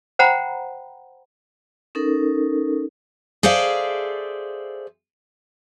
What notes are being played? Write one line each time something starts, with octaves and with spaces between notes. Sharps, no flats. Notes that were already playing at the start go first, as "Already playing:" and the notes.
C5 F#5 G5 A#5 B5
C#4 D#4 A4 A#4
G#4 A4 C5 D5 E5 F5